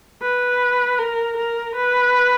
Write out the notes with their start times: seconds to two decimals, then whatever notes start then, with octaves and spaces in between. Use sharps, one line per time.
0.22 B4
0.98 A#4
1.37 A#4
1.75 B4